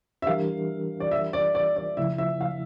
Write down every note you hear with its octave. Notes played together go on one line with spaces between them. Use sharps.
E5
E3 G3 D4 G4 A#4 F5
D5
E5
D5
D5
D5
C#3 F3 A3 E4 E5
E5
F5